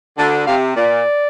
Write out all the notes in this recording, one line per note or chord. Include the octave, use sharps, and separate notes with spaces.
D2 D3 A5
C3 F5
A#2 D5